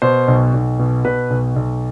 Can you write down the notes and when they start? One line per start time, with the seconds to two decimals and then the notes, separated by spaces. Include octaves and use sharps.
0.02 B2 C5
0.28 B1
0.54 B1
0.79 B2
1.05 B2 B4
1.30 B1
1.56 B1